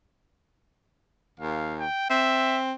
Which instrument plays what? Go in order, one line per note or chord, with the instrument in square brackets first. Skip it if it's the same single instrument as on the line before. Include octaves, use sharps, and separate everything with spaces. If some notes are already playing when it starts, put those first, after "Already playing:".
[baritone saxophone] D#2 [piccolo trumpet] F5
[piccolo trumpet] G5
[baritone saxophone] C4 [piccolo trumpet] E5